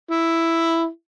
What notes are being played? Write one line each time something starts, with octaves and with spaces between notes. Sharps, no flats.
E4